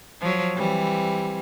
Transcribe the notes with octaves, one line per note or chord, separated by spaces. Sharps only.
F3 F#3
E3 G3 C4